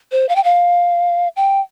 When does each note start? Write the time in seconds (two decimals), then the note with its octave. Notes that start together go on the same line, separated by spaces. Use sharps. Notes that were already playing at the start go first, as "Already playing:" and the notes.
0.12 C5
0.29 F5
0.36 G5
0.44 F5
1.36 G5